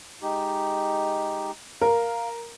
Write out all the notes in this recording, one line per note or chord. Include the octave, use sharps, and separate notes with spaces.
G#3 D#4 G4
A#4 F5